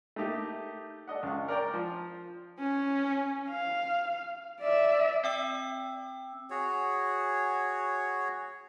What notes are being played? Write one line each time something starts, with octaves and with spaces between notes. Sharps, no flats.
A3 A#3 D#4 G4
A4 D5 D#5 F#5
C#2 C#6
A#4 D5 G5 A#5
F3
C#4
F5
D5 E5
C4 G5 E6
F#4 G#4 C#5